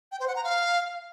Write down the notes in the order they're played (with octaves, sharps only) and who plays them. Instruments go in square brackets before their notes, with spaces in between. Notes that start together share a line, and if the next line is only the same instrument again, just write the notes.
[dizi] G5
C5
F#5
A#5
F5